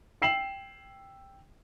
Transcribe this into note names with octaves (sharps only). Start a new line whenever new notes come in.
G5 E6 C7 E7 F#7